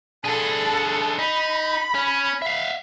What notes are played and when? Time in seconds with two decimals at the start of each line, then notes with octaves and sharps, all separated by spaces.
0.24 D4 G#4 A4
1.19 D#4 B5
1.95 C#4
2.42 E5 F5